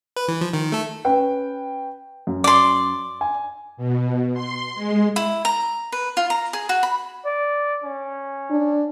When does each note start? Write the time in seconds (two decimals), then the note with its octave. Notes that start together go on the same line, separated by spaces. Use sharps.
0.17 B4
0.28 E3
0.41 F3
0.53 D#3
0.72 A3 A4
1.05 C#4 B4 G5
2.27 F#2
2.44 D5 C6
3.21 G#5
3.77 B2
4.34 C6
4.75 G#3
5.16 E4
5.45 A#5
5.92 B4
6.17 F4
6.30 A#5
6.53 G#4
6.69 F#4
6.83 B5
7.25 D5
7.84 C#4
8.50 D4